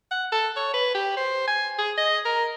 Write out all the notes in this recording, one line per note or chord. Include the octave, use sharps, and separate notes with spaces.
F#5
A4
C#5
B4
G4
C5
G#5
G#4
D#5
A#4